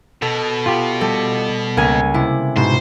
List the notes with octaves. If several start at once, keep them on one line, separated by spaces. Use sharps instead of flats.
B2 A4
F4 G4
G3 A4
C#2 A#3 G#5
C3 E4
G#2 B2 C5